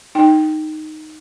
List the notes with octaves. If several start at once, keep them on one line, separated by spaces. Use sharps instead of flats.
D#4 G5